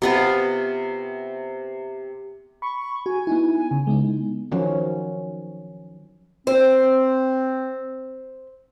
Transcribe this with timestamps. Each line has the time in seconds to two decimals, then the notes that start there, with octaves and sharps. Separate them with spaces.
0.02 C3 B3 F4
2.62 B5 C#6
3.06 F#4 G#5
3.27 B3 D#4 E4
3.71 C#3
3.87 G#3 B3 D#4
4.52 D#3 F3 F#3 C#4
6.47 C4 C5